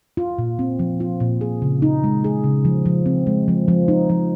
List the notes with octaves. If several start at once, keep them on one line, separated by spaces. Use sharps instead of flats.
F4
A#2
C4
F3
F4
A#2
G#4
C#3
D#4
G#3
G#4
C#3
F3
F3
C4
G#3
F3
F3
D#4
F3